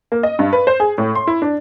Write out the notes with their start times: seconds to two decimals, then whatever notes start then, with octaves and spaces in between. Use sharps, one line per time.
0.12 A#3
0.23 D#5
0.39 G2
0.53 B4
0.67 C5
0.80 G#4
0.98 A2
1.15 C6
1.27 E4
1.42 D4